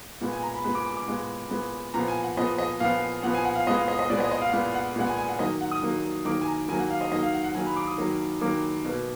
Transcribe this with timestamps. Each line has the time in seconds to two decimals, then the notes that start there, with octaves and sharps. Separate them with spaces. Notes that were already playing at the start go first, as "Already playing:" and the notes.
0.21 A#2 G#3 B3
0.32 G#5
0.43 A#5
0.54 B5
0.64 A#2 G#3 B3 B5
0.75 D6
0.86 D6
0.97 D6
1.08 A#2 G#3 B3
1.51 A#2 G#3 B3
1.94 A#2 F3 B3 A#5
2.08 G#5
2.23 F#5
2.37 A#2 F3 B3 D#5
2.58 D#5
2.80 A#2 F3 B3 F5
3.23 A#2 F3 B3 F#5
3.34 G#5
3.45 F#5
3.56 F5
3.67 A#2 G#3 B3 D#5
3.77 F5
3.88 D#5
3.99 D#5
4.10 A#2 G#3 B3 D5
4.20 D#5
4.31 D#5
4.41 F5
4.49 F#5
4.53 A#2 G#3 B3 F5
4.75 F#5
4.96 A#2 G#3 B3 F#5
5.06 G#5
5.17 G#5
5.29 F#5
5.39 D#3 F#3 A#3 D#5
5.61 F#5
5.71 D#6
5.82 D#3 F#3 A#3
6.25 D#3 F#3 A#3 D6
6.41 G#5
6.47 A#5
6.68 D#3 F#3 A#3 G#5
6.79 F#5
6.90 F5
7.01 D#5
7.12 D#3 F#3 A#3 D#5
7.23 F5
7.33 F#5
7.44 F#5
7.55 D#3 F#3 A#3 G#5
7.66 B5
7.76 D6
7.87 D#6
7.98 D#3 F#3 A#3
8.41 D#3 F#3 A#3 D6
8.85 B2 A#3